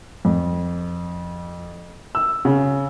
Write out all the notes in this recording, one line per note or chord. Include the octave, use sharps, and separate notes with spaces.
F2
E6
C#3